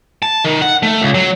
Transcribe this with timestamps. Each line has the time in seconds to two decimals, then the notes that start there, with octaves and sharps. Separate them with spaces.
0.22 A5
0.44 D#3
0.62 F#5
0.83 A3
1.02 C#2
1.14 F#3